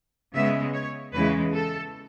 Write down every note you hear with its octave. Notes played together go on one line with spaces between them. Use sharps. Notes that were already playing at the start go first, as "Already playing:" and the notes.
C#3 G#3 B3 E5
C#5
E2 C#3 E3 G#3 B4
A4